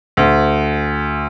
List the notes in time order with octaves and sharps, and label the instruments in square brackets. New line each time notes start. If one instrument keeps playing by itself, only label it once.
[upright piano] D2